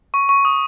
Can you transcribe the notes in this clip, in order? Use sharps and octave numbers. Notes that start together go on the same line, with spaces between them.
C#6
C#6
D#6